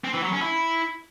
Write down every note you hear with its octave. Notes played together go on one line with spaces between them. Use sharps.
C4
E3
F#3
C#4
E4